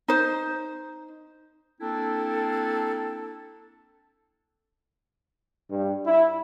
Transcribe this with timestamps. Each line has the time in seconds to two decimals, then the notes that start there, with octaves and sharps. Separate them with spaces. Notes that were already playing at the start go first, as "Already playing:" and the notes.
0.08 D#4 C5
1.80 A#3 C4 D4 E4 A4
5.70 G2
6.07 E4